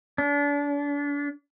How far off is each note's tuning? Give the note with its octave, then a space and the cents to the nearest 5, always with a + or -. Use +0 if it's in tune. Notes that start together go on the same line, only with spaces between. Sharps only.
D4 -35